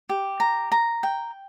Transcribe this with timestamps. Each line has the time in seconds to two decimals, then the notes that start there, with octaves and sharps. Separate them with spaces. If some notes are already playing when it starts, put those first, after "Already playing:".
0.09 G4
0.40 A#5
0.72 A#5
1.03 G5